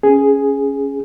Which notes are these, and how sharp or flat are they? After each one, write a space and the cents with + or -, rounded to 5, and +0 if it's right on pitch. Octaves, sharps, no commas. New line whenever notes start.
C#4 +5 G#4 +0